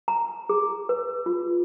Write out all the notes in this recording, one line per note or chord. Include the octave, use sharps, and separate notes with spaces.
A#5
G#4
B4
F4